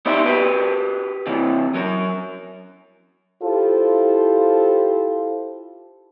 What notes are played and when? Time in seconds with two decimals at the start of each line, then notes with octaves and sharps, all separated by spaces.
0.06 B3 D#4 G4 C5 D5 E5
0.26 F#4 G4 B4
1.27 C3 E3
1.74 F#3 A#4
3.42 E4 F4 G4 A4 C5